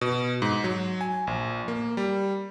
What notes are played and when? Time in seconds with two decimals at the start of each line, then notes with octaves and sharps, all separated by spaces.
0.01 B2
0.42 G#2
0.64 F#3
1.01 G#5
1.27 A#1
1.68 A#3
1.97 G3